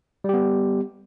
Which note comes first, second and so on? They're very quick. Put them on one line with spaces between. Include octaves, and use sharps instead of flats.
G3 G4 B3